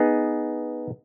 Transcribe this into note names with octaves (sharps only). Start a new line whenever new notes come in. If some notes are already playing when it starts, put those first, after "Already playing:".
Already playing: B3 D#4 G#4